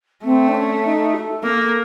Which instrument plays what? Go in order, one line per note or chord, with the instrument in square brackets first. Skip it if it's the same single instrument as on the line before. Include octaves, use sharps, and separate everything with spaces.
[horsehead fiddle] A3 [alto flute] C4
[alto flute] D4
C#4
D#4
A4
[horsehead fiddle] A#3